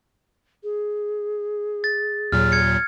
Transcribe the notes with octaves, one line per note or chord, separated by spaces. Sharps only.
G#4
A6
D#2 A#2 F#3 F6
G#6 C#7